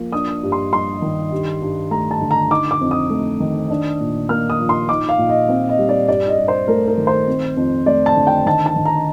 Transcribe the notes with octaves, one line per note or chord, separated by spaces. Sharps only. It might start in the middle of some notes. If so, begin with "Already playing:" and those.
Already playing: F3 A#3
D4 D#6
G2
C6
G3 C6
D#3
G2
G2
A3 A#5
A5
D3
A#5
D#4 D6
D6
F2
D#6
A3
D#3
D4
A#2
A#3 F6
D#6
F3
C6
D#4 D6
F5
A#2
D#5
C4
D#5
G3
D5
G2 D5
D#5
G2
C5
A3 A#4
A#4
D#3
C5
C4
F2
A3 D5
A5
D3
G5
D#3 A5
A5
D#3
A#5